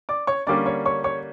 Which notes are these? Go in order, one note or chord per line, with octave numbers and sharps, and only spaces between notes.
D5 D6
C#5 C#6
D3 G3 A#3 C#4 D5 D6
C#5 C#6
C#5 C#6
C#5 C#6